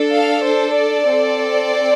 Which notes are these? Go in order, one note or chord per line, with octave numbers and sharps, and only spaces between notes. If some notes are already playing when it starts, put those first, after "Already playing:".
Already playing: D4 A4
F5
C5
D5
C4 A4